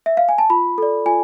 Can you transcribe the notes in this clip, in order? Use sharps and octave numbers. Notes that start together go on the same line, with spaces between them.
E5
F5
G#5
A5
F4 B5
A4 D5
F4 G#5